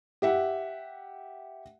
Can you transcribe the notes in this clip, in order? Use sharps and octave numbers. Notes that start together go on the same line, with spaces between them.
G4 E5 F#5